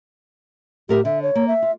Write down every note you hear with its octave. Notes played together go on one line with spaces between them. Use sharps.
A2 G4 A#4 E5
D3 E5
C#5
A#3
E5
F4